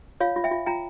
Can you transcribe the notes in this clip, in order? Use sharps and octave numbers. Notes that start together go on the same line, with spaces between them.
F4 C#5 F5
F4
E5 G5
F4
F4 G5 A#5